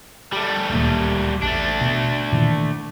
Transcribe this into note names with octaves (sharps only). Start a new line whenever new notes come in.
G3 A3
D1 D#2 A#2
A1 E2 A3 D4
B2
A#2 D#3 E3